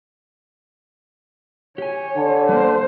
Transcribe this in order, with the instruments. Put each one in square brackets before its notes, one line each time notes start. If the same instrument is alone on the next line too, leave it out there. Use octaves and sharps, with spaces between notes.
[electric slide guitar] G4 G#5 [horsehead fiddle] C#5
[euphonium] D3
[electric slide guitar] G3 A#3 [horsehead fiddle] C5